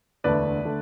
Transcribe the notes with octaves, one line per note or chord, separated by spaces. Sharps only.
E1 D2 D3 A3 B4 D5
D3 A3